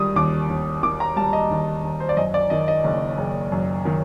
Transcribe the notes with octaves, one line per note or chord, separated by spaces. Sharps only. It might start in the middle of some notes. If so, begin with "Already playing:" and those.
Already playing: D#3 G3 D#6
D#2 D6
D#2
D#3 D6
A#5
G3 A5
D#5
D#2
D#2
C5
D5
F#2 D#5
D5
D#3 D#5
D#5
F#1
F#1
F#2
D#3